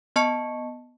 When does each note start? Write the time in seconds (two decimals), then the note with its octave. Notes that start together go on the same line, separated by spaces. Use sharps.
0.16 B3 D#5 A5 C#6 C#7